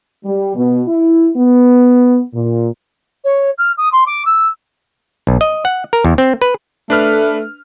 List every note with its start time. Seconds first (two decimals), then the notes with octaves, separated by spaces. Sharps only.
0.25 G3
0.55 B2
0.87 E4
1.37 B3
2.34 A#2
3.24 C#5
3.58 F6
3.77 D#6
3.92 C6
4.06 D6
4.26 E6
5.27 B1
5.41 D#5
5.65 F#5
5.93 A#4
6.05 E2
6.18 C4
6.42 B4
6.90 A3 D4 B4 F6